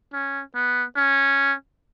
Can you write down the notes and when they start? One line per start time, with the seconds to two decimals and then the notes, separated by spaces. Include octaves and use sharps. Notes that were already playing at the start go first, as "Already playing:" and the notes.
0.13 C#4
0.55 B3
0.96 C#4